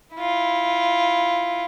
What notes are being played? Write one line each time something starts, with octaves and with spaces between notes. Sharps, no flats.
E4 F4